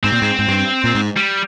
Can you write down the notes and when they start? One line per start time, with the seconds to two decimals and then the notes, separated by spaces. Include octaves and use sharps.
0.04 G#2 C4
0.12 A#2
0.22 G#2
0.39 G#2
0.48 G2
0.84 A#2
0.95 G#2
1.17 G3